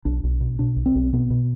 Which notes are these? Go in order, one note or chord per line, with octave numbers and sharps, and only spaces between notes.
B1 D4
B1
B2
B2 D4
B1
C4
B1
B2 B3
B2